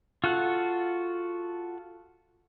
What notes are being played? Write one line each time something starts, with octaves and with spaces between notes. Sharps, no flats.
F4 F#4 A4 F#5